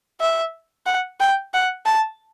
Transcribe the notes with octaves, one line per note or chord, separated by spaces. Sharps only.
E5
F#5
G5
F#5
A5